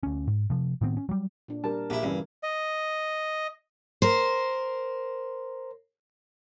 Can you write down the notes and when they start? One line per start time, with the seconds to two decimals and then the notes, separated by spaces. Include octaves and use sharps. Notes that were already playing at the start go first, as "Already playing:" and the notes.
0.03 D2 C#4
0.27 G#2
0.50 C3 F3
0.81 A2 D#3 B3 C4
0.97 C#4
1.09 F#3 G3
1.48 A#2 D4
1.64 G3 D4 A#4 A5
1.90 A#1 E4 G4
2.03 G2 C#3 E3
2.43 D#5
4.02 A#4 C5